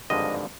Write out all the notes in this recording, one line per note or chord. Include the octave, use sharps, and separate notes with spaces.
G#1 G2 D3 F3 G#3 D#5